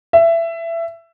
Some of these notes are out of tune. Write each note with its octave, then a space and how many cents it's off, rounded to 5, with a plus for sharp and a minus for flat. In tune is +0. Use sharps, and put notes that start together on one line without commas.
E5 +20